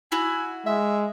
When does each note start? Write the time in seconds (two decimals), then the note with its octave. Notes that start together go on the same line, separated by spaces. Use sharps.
0.12 E4 F#4 G#5
0.66 G#3 E5